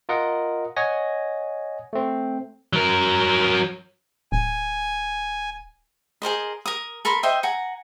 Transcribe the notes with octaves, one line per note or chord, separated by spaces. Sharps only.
F4 A#4 D#5 F#5
C#5 D#5 F#5 G#5 A#6
A3 C4
F#3 A#4
D1 G#5
G#4 A#4 C5 D#5
A#4 D#6
A4 A#4 B5 C6
C5 D#5 E5 G5
F#5 G#5 A#5